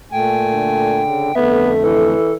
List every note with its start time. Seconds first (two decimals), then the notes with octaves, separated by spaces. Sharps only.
0.12 A#2 A3 G5 G#5
0.53 D3
1.04 C#3
1.35 F2 D3 A3 B3 E5
1.84 E3 A4